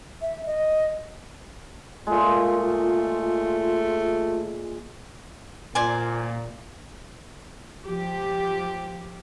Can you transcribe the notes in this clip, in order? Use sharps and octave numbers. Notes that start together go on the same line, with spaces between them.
E5
D#5
A#2 G#3 A3 F4
A#2 C5 D5 G#5
F3 G4